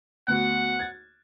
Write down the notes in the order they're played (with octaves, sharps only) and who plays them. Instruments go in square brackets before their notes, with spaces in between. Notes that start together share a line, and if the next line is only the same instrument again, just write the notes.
[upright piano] D2 B3 F#4 [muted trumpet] F#5
[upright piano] G#6 A6